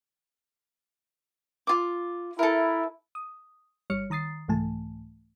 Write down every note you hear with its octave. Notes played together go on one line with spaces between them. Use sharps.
F4 D6
E4 A4 A#4
D#6
G1 G3 C#5 F6 C#7
D#3 A#5 D#6 A6 C7
C2 G#2 E3 A3 G#5 A5